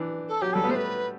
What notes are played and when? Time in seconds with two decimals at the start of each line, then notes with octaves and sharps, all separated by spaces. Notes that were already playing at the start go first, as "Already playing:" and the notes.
Already playing: E3 D4
0.28 A4
0.41 F#3 G4
0.53 G3 A4
0.64 B3
0.69 A3 C5
0.75 B4